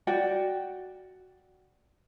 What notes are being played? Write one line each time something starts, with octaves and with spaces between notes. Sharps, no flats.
F#4 D5 G5